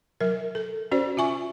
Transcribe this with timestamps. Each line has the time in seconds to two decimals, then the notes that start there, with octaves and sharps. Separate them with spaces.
0.20 F#3 A#4
0.55 A4
0.91 C#4 F#4 C5 D5
1.17 F4 E5 G#5 C#6